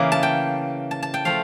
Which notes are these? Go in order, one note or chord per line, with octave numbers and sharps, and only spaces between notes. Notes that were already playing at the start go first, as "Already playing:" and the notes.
Already playing: C#3 E3 A#3
A5
G5
A5
A5
G5
F3 A3 F5